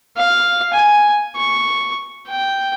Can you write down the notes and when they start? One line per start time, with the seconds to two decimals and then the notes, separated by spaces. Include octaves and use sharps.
0.16 F5
0.73 G#5
1.35 C#6
2.28 G5